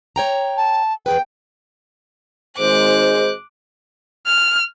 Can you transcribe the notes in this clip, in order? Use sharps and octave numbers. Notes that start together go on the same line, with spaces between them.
C#5 G5 A#5
A5
E2 G#4 B4 G5
G#1 G#2 G#3 C5 D6 F#6
F6